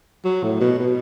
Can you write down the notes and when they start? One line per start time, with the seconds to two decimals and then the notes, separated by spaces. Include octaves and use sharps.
0.25 F#3
0.43 A2
0.60 B2
0.79 B2